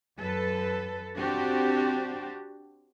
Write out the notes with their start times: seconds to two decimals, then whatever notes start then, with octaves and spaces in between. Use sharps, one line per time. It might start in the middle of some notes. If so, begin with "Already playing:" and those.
0.16 F#2 A4 B4
1.17 C4 D4 F#4 G4